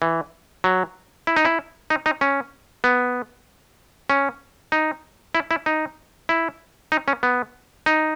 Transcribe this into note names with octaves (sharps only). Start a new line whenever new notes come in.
E3
F#3
E4
D#4
E4
D#4
D#4
C#4
B3
C#4
D#4
E4
E4
D#4
E4
D#4
C#4
B3
D#4